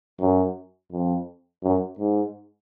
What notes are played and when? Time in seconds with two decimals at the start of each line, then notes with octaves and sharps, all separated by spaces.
0.20 F#2
0.92 F2
1.63 F#2
1.99 G#2